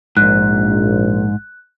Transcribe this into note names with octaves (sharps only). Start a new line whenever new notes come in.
A#1 G#2 F#6